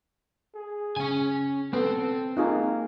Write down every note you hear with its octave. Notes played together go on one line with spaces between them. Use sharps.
G#4
C#3 C#4 G#5
B3 C4 A4
A#3 D#4 F4 G#4